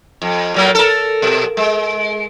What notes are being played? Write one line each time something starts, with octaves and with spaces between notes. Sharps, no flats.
F2
A#2 F#3 A#3
A4 A#4
B2
G#3